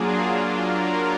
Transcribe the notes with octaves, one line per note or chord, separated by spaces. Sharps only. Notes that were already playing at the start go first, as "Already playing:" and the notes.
Already playing: F#3 A#3 D4 F4 G#4
A#4